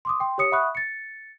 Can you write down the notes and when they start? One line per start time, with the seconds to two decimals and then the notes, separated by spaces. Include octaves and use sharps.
0.05 C6 D6 D#6
0.20 G5 C6
0.38 G4 C#5 D#6 C#7
0.52 E5 F#5 B5 C#6 D#6 F#6
0.75 A6 C#7